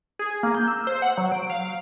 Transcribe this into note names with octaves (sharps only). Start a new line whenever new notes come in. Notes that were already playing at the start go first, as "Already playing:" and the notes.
G#4
A#3
G6
E6
C5
F#5
F#3
D7
F5